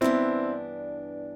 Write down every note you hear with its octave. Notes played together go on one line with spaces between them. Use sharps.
G2 E3 B3 C4 D4 E4